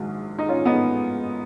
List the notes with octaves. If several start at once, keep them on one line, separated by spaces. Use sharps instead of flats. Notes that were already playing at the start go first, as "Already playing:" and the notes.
Already playing: A#1 G#2 D#3 F#3
D#4
C#4 F4
B3 D#4